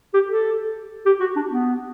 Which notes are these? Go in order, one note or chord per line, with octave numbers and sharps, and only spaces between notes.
G4
A4
G4
F#4
D4
B3